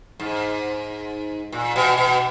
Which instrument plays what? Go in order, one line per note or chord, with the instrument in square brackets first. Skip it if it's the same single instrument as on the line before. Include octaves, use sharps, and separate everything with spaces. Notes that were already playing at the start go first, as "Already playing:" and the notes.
[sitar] G#2
A#2
B2
B2